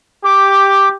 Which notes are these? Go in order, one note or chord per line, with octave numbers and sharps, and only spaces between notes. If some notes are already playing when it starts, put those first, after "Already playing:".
G4 D6